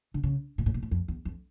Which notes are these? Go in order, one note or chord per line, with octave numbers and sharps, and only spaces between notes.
D3
C#3
A#2
A2
A#2
A2
F2
E2
F2